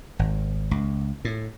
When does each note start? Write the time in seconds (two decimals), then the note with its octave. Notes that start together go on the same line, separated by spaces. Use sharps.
0.19 G#1
0.71 C#2
1.25 A2